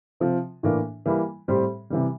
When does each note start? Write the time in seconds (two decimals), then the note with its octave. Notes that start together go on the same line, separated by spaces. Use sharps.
0.20 C3 F3 C4
0.63 A2 E3 A#3 D4
1.06 E3 G3 A#3 E4
1.48 A2 G3 C4 G4 C5
1.90 C3 E3 G3